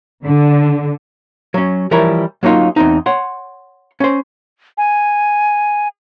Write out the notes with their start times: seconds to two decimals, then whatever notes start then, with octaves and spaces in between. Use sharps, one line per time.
0.25 D3
1.54 F#3 C#4
1.91 E3 F3 G3 E4 A#4 C#5
2.43 F#3 A#3 C#4 D#4 F4
2.76 E2 C4 D#4
3.06 C#5 F#5 C6
4.00 C#4 C5
4.78 G#5